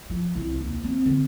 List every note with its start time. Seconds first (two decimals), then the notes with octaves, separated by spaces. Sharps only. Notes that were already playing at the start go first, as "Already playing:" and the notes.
0.10 F3
0.35 C2
0.60 D#2
0.84 C4
1.05 D3